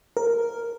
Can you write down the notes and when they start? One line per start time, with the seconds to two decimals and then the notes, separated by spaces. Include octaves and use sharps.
0.17 A#4